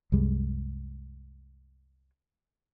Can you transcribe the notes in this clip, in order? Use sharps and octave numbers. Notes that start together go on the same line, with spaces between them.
C2 F#2 G3 G#3